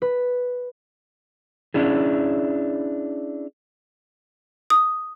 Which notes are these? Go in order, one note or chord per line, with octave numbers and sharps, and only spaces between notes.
B4
C#4 D4 E4 G#4
D#6